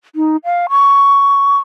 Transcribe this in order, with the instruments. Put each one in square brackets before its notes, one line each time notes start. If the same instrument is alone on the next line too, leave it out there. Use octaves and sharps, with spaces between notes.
[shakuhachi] D#4
F5
C#6